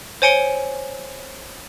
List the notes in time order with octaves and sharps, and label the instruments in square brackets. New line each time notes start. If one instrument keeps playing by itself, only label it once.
[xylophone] C5 C#5 G#5 C#7 D7 G7